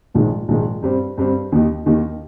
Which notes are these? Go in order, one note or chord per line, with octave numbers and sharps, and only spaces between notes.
A#1 G#2 D#3 G#3
A#1 G#2 D#3 G#3
G2 G3 C4
G2 G3 C4
D#2 D#3 A#3 D#4 G4
D#2 D#3 A#3 D#4 G4